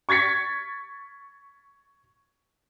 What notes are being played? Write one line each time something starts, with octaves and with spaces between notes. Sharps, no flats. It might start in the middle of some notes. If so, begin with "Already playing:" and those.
C#6 G#6 A6 B6 C#7